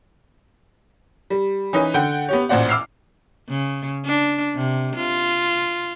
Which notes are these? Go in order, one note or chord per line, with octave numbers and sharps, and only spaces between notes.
G3
E3 C#4 D#4 B4
D3 F#5 G5 G6
B3 G4 C#5
A1 A#2 C5 D5 F#5
D6 E6 F6 C7
C#3
D4
C3
F4